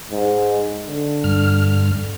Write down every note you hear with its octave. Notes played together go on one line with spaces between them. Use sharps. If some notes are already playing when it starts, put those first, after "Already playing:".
G#2
D3
G2 F6